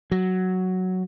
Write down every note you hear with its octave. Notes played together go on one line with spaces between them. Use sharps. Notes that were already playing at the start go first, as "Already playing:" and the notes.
F#3